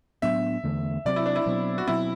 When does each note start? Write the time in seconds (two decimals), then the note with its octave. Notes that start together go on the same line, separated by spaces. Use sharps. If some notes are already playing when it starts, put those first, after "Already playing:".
0.22 A2 F#3 B3 D4 E5
0.64 E2 D3 A3
1.05 C3 F#3 C4 D5
1.16 E4
1.26 D4
1.36 E4
1.46 B2 F#3 C4
1.78 F#4
1.88 B2 F#3 C4 E4